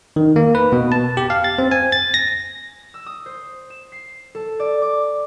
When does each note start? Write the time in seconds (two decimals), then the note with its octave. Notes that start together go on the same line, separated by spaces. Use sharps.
0.16 D#3
0.36 A#3
0.55 B4
0.72 B2
0.92 A5
1.17 G4
1.30 F5
1.44 A6
1.58 C4
1.71 G#5
1.92 A6
2.14 A#6
2.94 E6
3.06 D#6
3.26 C5
3.70 E7
3.92 C7
4.35 A4
4.60 D5
4.82 D6